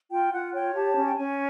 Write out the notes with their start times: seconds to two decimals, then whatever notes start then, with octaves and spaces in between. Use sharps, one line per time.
0.11 F4 G5
0.33 F4 F#5
0.53 C#5 G5
0.74 G4 A5
0.97 C#4
1.06 G5
1.17 C#4 G#5